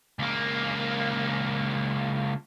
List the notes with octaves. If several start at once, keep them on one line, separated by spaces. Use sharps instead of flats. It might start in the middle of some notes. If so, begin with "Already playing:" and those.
C#2 A#3